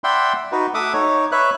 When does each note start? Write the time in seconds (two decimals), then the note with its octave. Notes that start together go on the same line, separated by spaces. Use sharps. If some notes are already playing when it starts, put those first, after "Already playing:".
0.04 D5 E5 F#5 G5 B5 C6
0.52 D#4 F#4 B4
0.74 A3 E5 F#5 D6 D#6
0.93 D#4 C#5
1.32 B4 C#5 E5 F#6